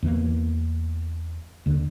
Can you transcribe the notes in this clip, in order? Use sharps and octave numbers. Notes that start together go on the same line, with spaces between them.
E2 E3 F3 A#3
D#2 D3